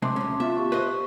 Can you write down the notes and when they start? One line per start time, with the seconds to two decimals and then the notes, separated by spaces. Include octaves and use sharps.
0.02 C3 G#3 C4 A5 C6 D6
0.16 D2 C#4
0.40 B3 F4 E5
0.57 G4 C#6
0.72 B4 C5 D#5